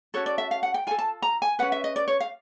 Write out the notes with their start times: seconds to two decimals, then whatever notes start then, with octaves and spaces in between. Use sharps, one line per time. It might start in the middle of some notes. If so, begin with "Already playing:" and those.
0.14 C#4 F#4 A4 C#5
0.26 D5
0.38 E5
0.51 F5
0.63 F#5
0.74 G5
0.87 F4 G#5
0.91 A4
0.99 A5
1.22 A#5
1.42 G#5
1.59 C#4 F#4 B4 F#5
1.72 E5
1.84 D#5
1.96 D5
2.08 C#5
2.20 F5